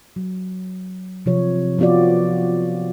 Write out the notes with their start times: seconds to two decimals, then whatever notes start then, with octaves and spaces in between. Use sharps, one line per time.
0.16 F#3
1.26 C3 F3 C#5
1.79 F3 B3 F4 F#4 D5